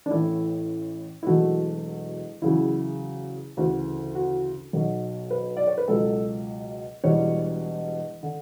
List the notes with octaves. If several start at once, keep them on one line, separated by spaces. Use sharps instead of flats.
D4
A1 A2 E3 A3 E4
E4
E1 E2 B2 F#3 A3 F#4
E2 C#3 F#3 E4
D2 C#3 E3 F#4
F#4
B1 B2 F#3
B4
D5
C#5
B4
C#2 B2 F#3 A4
E1 E2 B2 G3 C#5
D3